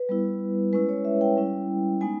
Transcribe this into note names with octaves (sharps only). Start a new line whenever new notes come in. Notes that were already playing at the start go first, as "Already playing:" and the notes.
Already playing: B4
G3 B3 E4
G#3 C#4 E4 B4
C#5
E5
G5
G3 C#4 E4
G#3 B3 D#4 G#5